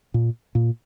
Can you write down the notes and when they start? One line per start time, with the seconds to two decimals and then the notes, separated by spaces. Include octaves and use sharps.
0.14 A#2
0.55 A#2